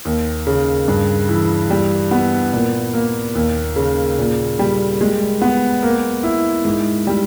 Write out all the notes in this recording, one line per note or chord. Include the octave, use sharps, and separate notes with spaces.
D#2
C#3
G2
E3
G3
B3
A#2
A#3
D#2
C#3
A#2
G3
G#3
B3
A#3
E4
G#2
G3